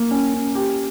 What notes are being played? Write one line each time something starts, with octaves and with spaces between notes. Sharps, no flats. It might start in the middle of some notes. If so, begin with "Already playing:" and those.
Already playing: A#3
C#4
C#4
G4